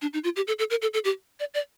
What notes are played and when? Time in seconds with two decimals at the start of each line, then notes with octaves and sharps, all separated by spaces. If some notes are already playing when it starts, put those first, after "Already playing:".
0.02 D4
0.13 D#4
0.24 F4
0.36 G4
0.47 A4
0.59 A4
0.70 A#4
0.82 A4
0.94 A4
1.04 G4
1.40 D5
1.54 D5